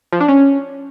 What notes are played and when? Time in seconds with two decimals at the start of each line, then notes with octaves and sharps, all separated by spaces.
0.13 F3
0.20 D4
0.28 C#4